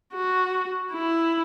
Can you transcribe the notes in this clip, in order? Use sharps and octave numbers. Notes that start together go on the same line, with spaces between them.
F#4
E4